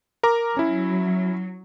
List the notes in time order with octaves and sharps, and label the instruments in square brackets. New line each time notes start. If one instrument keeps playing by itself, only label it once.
[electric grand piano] A#4 A#5 D6
[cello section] F#3 [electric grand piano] C#4 E4